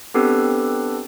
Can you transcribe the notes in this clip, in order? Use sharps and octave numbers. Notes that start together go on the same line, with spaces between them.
B3 C4 D4 G4 A4 B4